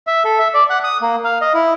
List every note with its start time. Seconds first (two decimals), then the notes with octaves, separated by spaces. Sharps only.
0.07 E5
0.25 A4
0.39 E5
0.54 D5
0.70 F#5
0.84 D#6
1.02 A#3
1.24 F5
1.41 D#5
1.54 E4